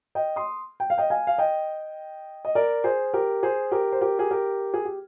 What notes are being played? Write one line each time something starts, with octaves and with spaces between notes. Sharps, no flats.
D#5 G5
C6 D#6
G5
F5
D#5 G5
F5 G#5
F5
D#5 G5
D#5
A#4 D5
G#4 C5
G4 A#4
G#4 C5
G4 A#4
C5
G4 A#4
G#4
G4 A#4
G#4
G4